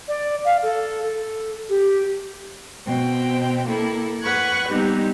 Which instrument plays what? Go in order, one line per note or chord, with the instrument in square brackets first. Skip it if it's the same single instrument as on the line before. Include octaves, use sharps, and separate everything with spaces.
[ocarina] D5
F5
A4
A4
G4
[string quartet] B2 C4 G5
A#3 E4 A4
B4 F#5 C#6 F#6 G#6
G3 B3 C4 D#4 G4